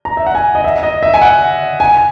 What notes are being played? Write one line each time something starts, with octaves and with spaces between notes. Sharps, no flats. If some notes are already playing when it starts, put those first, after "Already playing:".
A#5
E5
F#5
G#5
D#5
E5
D#5
E5
G#5
F#5
G#5